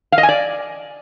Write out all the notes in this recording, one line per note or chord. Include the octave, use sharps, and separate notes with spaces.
F5
D#5
G#5
D5